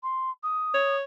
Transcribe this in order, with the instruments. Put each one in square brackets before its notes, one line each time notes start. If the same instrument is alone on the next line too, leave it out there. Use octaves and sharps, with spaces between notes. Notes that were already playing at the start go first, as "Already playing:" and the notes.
[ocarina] C6
D#6
[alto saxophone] C#5